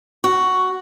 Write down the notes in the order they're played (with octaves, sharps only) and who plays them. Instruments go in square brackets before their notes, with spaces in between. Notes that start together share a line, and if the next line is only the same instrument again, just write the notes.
[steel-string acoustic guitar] F#4